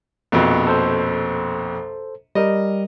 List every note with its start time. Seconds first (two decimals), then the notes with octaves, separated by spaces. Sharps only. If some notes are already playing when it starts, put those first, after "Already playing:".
0.32 A#1 F2 B2
0.67 A4 C5
2.35 G3 A#4 D#5